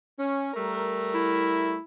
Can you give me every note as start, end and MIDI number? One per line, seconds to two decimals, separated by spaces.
0.18 0.51 61
0.53 1.75 55
0.53 1.75 57
0.53 1.75 70
1.15 1.82 64